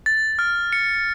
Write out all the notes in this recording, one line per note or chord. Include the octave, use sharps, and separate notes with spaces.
A6
F6
C#7